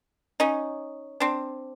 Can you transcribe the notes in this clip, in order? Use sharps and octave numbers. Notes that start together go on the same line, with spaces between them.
C#4 D#4
C4 D4